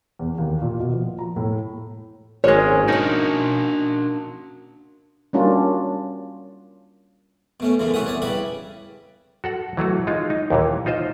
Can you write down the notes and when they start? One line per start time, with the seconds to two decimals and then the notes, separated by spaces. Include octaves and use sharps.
0.19 E2
0.38 D#2
0.62 A#2
0.80 B2
0.93 F3
1.19 A#5
1.36 A2
2.44 G#1 G#3 A#3 C#4 C#5
2.88 D4 D#4 F#4 A#4 F#5 G#5
5.33 G3 A#3 C#4 D4 F4 F#4
7.60 B2 A3 C#4
7.79 F#2 A2 C#3 E3
7.94 C2 C#4 E5 F#5 D#6
8.07 C#5 D5 D#6
8.22 C#3 G3 E4 B4 B5
9.44 F#4 A4 F#5
9.77 E3 F#3 A3 F#4
10.07 G#3 D#4 F4
10.30 D#4
10.50 D#2 A#2 E3
10.86 D#4 F4 C5 D#5